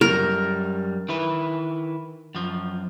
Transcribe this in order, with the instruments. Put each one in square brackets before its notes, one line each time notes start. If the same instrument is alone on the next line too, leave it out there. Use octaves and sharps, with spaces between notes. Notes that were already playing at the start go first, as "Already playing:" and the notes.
[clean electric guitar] F#2 G3 [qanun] A#4
[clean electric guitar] D#3 E4 B4
F#2 F3